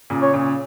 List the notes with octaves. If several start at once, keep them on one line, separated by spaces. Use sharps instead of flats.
A#2 C#3
C#5
A#2 C#3